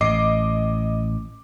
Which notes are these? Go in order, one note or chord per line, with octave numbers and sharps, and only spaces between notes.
A1 D#5 D6 C7